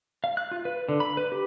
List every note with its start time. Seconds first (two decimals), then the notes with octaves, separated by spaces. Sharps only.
0.24 F5
0.37 F#6
0.51 F4
0.65 B4
0.89 D3
1.00 B5
1.17 B4
1.32 G4